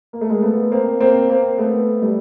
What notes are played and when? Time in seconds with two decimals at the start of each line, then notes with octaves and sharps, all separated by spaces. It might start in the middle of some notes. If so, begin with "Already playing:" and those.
0.13 A#3
0.21 A3
0.29 G#3 A#3
0.42 A3 B3
0.72 A#3 C4
1.01 A#3 C4
1.29 A#3 C4
1.58 A3 B3
2.02 G3 A3